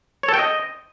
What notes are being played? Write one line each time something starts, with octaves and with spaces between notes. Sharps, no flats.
C#5
A4
G5
D#5